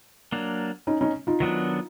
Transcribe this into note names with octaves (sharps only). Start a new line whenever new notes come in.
F#3 A#3 D4
C#4 D#4
C#4 D#4
D#4 F4
D#3 F#3 B3 D4